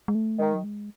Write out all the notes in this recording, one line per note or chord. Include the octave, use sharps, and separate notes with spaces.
G#3
A3
D#3 G#3
F#3
G#3